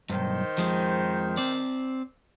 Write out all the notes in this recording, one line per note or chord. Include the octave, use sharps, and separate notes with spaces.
B1 E2 G2 D#3 C5
F2 F3 G#3
C4 D5